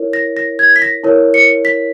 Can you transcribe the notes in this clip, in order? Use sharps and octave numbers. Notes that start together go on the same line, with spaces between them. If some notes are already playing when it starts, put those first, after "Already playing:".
Already playing: E4 A#4 C#5
A#6
A#6
G#6
B6
A#6
E4 A#4 C#5
C#7
B6